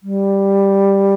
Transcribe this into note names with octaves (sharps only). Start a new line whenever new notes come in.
G3